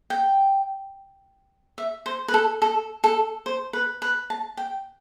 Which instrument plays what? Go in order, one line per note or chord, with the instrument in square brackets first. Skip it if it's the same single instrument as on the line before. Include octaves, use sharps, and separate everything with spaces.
[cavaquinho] G5
E5
C5
B4
A4
A4
A4
C5
B4
B4
A5
G5